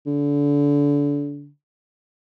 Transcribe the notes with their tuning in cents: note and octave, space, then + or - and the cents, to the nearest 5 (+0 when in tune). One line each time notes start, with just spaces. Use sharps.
D3 -30